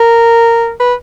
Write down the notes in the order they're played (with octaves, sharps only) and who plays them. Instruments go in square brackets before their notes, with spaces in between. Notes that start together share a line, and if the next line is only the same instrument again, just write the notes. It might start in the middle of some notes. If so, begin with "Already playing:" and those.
Already playing: [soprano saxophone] A#4
B4